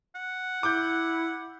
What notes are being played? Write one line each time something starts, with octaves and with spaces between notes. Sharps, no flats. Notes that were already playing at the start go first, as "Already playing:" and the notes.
F#5
E4 D6 G6